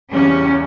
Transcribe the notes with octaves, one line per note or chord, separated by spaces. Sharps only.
E2 C#3 G3 C#4